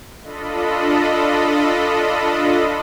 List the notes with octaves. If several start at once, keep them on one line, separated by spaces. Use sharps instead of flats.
D4 F4 A4 D#5 B5